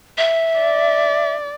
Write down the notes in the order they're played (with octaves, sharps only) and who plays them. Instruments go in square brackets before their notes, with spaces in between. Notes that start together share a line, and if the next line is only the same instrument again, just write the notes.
[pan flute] E5
[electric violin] D5